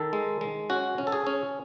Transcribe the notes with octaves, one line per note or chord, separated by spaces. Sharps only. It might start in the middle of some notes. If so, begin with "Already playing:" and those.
Already playing: D#3 A4
G#3
G#3
C#4 F#4
C#4
A4
G#4
C#4